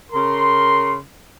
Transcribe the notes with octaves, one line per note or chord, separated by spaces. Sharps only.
C#3 A#4 C6